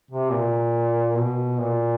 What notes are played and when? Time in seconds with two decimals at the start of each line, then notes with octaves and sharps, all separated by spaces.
0.11 C3
0.31 A#2
1.17 B2
1.60 A#2